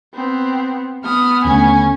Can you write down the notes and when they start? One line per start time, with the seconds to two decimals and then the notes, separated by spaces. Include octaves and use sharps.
0.14 B3 C4
1.05 B3 D#6 F6
1.45 D#2 D3 A3 C#4 G#5